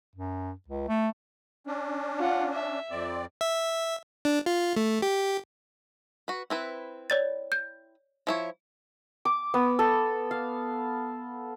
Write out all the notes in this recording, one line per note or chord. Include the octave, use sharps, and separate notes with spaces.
F#2
C#2
A3
C#4 D4
F4 F#5
E5
F2 C4 D5
E5
D4
F4
A3
G4
F#4 B4
C4 E4 B4
C#5 D5 A6
G6
F3 E4 C#5
D6
B3
A4
F5